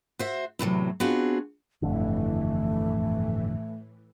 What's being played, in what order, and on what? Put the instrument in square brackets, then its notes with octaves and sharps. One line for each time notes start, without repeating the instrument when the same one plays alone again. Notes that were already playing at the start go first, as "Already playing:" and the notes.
[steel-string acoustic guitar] F#4 C5 E5
E2 A2 C3 F#3
B3 C4 D4 F4 F#4 G#4
[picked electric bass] G1 F2 D3 [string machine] A2 E3 [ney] A3